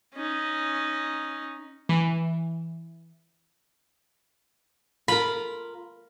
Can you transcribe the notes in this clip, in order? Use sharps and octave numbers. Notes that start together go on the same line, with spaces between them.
C#4 D#4
E3
F4 A#4 B5